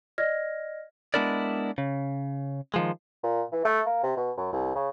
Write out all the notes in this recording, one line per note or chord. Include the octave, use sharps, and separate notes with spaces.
D5 D#5 F6 G#6 A#6
G#3 B3 D4 E4 A#4 D5
C#3
D#3 F3 G#3
A#2
E3
A3
A#3
C3
B2
F#2
C2
C#3